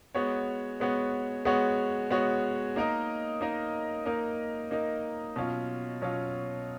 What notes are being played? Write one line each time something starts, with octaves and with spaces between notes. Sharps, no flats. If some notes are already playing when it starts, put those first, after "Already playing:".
G#3 B3 F#4 C#5
G#3 B3 F#4 C#5
G#3 B3 F#4 C#5
G#3 B3 F#4 C#5
A#3 D#4 A#4 D#5
A#3 D#4 A#4 D#5
A#3 D#4 A#4 D#5
A#3 D#4 A#4 D#5
B2 F#3 C#4 F4
B2 F#3 C#4 F4